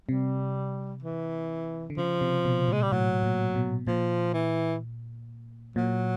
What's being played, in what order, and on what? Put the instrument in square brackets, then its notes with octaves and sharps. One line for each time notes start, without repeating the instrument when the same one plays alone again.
[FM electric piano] C3 [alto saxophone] G3
[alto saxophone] E3
[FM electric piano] D3
[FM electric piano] C#3 [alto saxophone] F3
[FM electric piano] C3
B2
[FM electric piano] A#2 [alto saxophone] G#3
[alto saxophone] G3
[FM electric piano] A2 [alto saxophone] F#3
[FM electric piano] A#2
B2
[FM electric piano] A#2 [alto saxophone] F3
[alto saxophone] E3
[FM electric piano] A#2 [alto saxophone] F#3